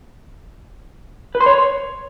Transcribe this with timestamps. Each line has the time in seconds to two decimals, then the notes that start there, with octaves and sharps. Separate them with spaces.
1.35 B4
1.40 C6
1.46 C#5